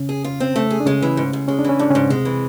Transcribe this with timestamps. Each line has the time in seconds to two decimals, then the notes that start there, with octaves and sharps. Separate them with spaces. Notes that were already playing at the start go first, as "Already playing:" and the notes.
Already playing: C#3 C#4
0.09 G#4
0.24 F4
0.40 C4
0.56 A3
0.70 G#4
0.80 D4
0.86 C#3 G#3 C#4
1.02 E3
1.17 G#2
1.33 G#2
1.48 G#3 C#4
1.59 D4
1.64 E3 C#4
1.79 G#2 D4
1.91 G#2 C#3 C#4
2.10 C3 G#3 C4
2.25 E3